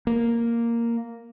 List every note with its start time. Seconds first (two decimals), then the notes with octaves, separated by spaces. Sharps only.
0.07 A#3